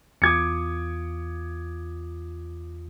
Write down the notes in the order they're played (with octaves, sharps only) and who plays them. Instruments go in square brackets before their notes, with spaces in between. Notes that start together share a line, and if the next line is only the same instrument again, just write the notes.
[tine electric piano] E2 F4 D#6 [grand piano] D6 G#6 C#7